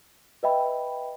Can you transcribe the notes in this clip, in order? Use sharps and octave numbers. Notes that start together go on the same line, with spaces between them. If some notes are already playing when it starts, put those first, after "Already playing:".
B4 D#5 E5 G5 B5